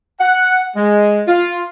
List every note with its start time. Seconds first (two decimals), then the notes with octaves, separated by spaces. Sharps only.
0.20 F#5
0.76 G#3
1.28 F4